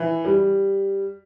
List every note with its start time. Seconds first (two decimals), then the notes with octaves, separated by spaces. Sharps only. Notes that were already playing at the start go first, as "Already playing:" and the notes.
Already playing: E3
0.25 G3